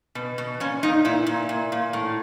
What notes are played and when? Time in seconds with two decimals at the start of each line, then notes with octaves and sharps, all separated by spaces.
0.15 B2
0.38 B2
0.60 A#2 C#4
0.83 A#2 D#4
1.05 A#2 E4
1.27 A#2
1.49 A#2
1.72 A#2
1.93 A2